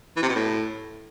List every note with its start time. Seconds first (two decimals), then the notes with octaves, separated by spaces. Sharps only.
0.16 E3
0.23 C3
0.29 B2
0.35 A2